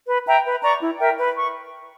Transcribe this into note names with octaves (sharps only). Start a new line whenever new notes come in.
B4
E5 G5 A#5
B4
D5 A#5 C#6
E4
A#4 E5 G5
B4
C#6